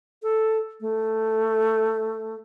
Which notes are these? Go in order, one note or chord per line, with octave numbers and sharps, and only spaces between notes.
A4
A3